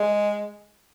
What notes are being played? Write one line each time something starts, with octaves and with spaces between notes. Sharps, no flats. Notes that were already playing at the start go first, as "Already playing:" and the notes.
Already playing: G#3